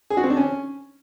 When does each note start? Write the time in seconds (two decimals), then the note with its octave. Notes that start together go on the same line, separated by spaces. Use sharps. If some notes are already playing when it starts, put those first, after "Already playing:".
0.10 G#4
0.17 F#4
0.24 C4
0.30 D4
0.37 C#4